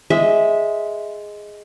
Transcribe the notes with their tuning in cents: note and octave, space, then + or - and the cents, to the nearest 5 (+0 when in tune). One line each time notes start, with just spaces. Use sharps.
G#3 +0 E5 -5